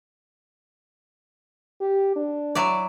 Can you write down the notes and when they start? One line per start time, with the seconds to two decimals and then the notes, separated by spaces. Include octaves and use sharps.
1.81 G4
2.16 D4
2.55 F#3 E4 D5